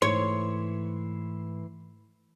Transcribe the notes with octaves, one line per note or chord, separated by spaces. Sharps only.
G#2 E3 A3 C#5 C6